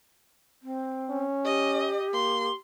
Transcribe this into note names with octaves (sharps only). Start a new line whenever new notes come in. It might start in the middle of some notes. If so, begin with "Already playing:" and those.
C4
C#4
G4 D#5
A#3 C6